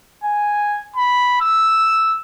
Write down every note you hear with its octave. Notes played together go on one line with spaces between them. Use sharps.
G#5
B5
E6